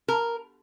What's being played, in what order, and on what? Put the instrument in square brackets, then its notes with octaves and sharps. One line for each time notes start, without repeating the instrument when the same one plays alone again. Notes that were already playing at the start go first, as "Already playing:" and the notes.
[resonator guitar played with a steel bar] A#4